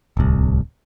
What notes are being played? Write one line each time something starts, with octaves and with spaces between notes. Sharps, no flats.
D1 C2